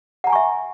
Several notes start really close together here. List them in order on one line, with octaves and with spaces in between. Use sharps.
F#5 A#5 G#5 C#6 E5